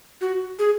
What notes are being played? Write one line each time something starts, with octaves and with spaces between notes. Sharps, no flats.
F#4
G#4